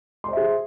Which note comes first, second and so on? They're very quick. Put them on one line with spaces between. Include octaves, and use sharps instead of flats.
C6 C5 E5 G#4